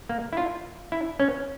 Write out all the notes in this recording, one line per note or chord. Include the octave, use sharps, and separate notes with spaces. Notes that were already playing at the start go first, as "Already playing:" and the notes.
A#3
E4
F4
E4
C#4